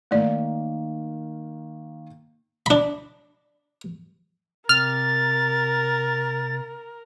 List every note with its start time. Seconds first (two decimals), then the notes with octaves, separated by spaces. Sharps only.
0.11 D#3 A3 A#3 D#4 D5
2.66 D4 B5
4.69 C3 A#4 F6 A6